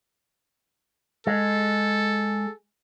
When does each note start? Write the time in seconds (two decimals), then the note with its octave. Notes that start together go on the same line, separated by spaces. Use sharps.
1.27 G#3 A4